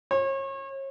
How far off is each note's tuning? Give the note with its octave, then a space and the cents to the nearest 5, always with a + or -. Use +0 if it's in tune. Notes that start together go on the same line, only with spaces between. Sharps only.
C#5 -35